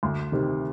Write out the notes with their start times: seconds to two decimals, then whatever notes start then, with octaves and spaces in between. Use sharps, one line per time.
0.03 D2
0.32 C3 D#3